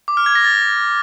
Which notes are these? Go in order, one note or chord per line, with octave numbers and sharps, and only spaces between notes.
D6
F6
G#6
A#6
A6